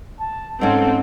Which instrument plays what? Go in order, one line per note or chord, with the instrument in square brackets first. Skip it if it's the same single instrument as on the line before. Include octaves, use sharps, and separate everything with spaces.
[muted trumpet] A5
[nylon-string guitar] G#2 C#4 [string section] C4 [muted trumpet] A4